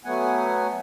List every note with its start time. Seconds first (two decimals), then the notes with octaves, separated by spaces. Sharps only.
0.05 F#3 A3 B3 F#5 G#5